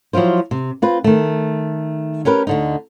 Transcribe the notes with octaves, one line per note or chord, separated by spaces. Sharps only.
F3 F#3 E4 F4 C5
C3
C4 F4 B4
D#3 A3
C#4 G4 A#4 B4
D2 D3 D#4